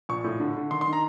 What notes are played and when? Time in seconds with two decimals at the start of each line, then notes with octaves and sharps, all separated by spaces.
0.09 A#1 C#6
0.24 A2
0.40 D3
0.57 D3
0.71 D#3 C6
0.81 C6
0.87 D#3
0.93 A#5